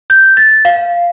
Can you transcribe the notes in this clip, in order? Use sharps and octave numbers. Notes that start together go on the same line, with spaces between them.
G6
A6
F5